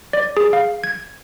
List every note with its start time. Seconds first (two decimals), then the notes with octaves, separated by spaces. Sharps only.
0.13 D5
0.37 G#4
0.53 F5
0.84 G#6